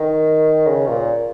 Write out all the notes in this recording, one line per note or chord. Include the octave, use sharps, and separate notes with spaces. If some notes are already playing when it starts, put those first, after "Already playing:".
Already playing: D#3
C#3
A#2